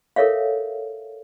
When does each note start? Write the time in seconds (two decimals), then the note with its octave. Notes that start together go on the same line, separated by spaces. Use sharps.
0.16 A4 A#4 C#5 E5 F5